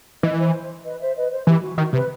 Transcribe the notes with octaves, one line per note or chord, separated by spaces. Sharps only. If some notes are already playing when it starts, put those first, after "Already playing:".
E3 B4 D#5
C5
B4 D#5
C5 E5
B4 D#5
C5
E3 G4
F#4
D#3 F#4
C3 B4